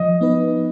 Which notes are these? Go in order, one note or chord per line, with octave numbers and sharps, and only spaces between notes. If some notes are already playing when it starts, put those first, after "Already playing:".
Already playing: F3 D#5
B3 D#4 B4